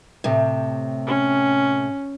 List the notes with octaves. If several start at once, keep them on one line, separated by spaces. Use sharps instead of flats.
A2 C3
C#4